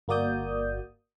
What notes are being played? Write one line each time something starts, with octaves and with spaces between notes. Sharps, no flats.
G1 A#3 F#4 D5 D#6 G6